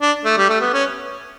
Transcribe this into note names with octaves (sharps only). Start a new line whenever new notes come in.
D4
A3
G3
A3
B3
C#4